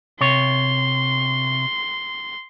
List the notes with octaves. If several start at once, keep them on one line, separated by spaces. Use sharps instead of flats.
C3 C#5 C6